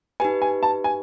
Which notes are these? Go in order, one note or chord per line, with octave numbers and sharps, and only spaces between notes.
D#4 G4 B4 G#5
G#5
A5
G#5